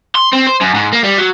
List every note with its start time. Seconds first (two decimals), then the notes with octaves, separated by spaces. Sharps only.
0.15 C6
0.33 C4
0.47 C5
0.61 F#2
0.74 G#2
0.93 A#3
1.04 G3
1.18 F#3